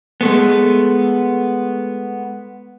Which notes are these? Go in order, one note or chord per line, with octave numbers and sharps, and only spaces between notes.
G#3 A3 B3